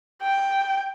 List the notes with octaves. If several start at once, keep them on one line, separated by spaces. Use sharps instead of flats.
G5